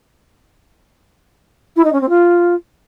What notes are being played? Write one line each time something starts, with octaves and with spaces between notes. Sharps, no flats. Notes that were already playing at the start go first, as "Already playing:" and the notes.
E4
D#4
C#4
C4
F4